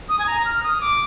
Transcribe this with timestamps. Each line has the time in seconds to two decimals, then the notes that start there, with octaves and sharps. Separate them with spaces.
0.09 D#6
0.19 G#5
0.27 A#5
0.45 F6
0.63 D#6
0.81 D6